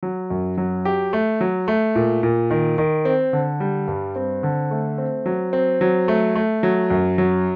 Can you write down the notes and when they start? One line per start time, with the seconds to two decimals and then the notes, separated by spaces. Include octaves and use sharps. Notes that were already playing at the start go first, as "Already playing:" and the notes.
0.03 F#3
0.30 F#2
0.58 F#3
0.85 G4
1.13 A3
1.41 F#3
1.68 A3
1.95 A#2
2.23 A#2
2.51 D#3
2.78 D#3
3.05 C4
3.33 D3
3.60 G3
3.88 G2
4.16 C4
4.43 D3
4.71 A3
4.98 C4
5.26 F#3
5.53 C4
5.81 F#3
6.08 A3
6.35 A3
6.63 F#3
6.90 F#2
7.18 F#3